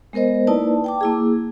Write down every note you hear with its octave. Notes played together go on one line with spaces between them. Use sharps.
G#3 B3 A#4 C5 D#5
A#3 D#4 E4 B4 D5 A5
G5 A5 D6
A#3 E4 G#4